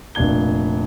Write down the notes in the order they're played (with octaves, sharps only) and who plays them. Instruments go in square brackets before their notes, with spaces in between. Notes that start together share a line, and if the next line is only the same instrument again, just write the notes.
[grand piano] F1 A#2 D4 G#6 G7